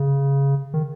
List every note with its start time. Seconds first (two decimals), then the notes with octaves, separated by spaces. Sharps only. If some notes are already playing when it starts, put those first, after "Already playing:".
Already playing: C#3
0.74 D#3